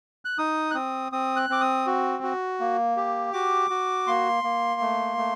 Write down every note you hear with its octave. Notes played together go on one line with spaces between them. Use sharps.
F#6
D#4 D#6
F#6
C4 D#6
C4 D#6
F#6
C4 D6
D#6
F#4
F#4
A#3
G4
F#4 D6
F#4
A#3 C6
A#3
A3
A3